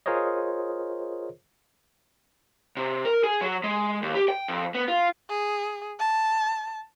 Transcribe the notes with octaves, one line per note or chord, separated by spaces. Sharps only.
F4 G#4 A#4 C5 C#5 D#5
C3
A#4
G#4
F#3
G#3
D#2
G4
G5
F2
B3
F4
G#4
A5